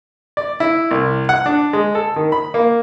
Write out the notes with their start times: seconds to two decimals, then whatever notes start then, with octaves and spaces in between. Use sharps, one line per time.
0.37 D5
0.60 E4
0.91 C2
1.29 F#5
1.46 D4
1.73 G#3
1.95 A4
2.16 D#3
2.32 B5
2.54 A#3